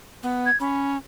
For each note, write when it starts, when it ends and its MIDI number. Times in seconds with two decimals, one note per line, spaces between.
0.23 0.49 59
0.46 0.59 92
0.60 0.97 61
0.60 0.93 83